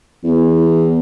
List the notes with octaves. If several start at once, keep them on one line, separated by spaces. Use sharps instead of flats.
E2